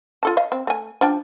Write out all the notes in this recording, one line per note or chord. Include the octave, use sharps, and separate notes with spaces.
F4 A4 A5
D#5 F5
C4
A3 G#5
F3 D4 G5